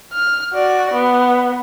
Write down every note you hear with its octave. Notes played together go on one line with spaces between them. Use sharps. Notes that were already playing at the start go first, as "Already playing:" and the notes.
F6
F#4 D5
B3